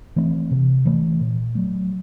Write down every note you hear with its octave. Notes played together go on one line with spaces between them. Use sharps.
E3 A3 C4
C3
E3 A3
A#2
F#3 A3